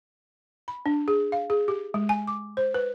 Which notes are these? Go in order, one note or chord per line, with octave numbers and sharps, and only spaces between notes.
B5
D4
G#4
F5
G#4
G4
G#3
G#5
D6
C5
B4